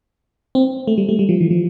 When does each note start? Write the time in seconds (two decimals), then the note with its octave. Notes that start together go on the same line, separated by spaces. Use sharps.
0.55 C4
0.87 A3
0.98 G3
1.09 A3
1.19 G3
1.29 F3
1.41 E3
1.51 F3